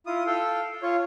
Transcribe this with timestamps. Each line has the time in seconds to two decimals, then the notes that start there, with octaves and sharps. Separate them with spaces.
0.06 E4 F4 D#6
0.27 A4 F5 G5
0.82 F4 C#5